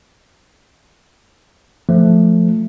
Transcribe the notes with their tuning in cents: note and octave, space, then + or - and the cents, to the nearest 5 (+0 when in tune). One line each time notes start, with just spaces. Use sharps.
F3 +0 A3 +0